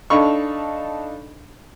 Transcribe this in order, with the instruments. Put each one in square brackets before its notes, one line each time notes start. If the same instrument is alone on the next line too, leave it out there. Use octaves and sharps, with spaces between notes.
[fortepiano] D4 D#4 A4 F5 B5 C#6